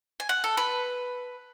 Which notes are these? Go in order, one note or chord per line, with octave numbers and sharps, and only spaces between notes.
G#5
F#5
A4
B4